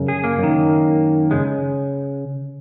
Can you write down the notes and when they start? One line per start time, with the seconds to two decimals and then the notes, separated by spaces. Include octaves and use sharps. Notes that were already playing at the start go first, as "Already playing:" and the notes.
Already playing: F#2 C#3
0.08 G#4
0.24 A#3
0.39 F#2 D#3
1.31 C#3 G#3